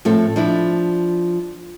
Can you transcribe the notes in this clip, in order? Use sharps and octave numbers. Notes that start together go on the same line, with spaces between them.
A2 F3 C4 A4
F3 D4 E4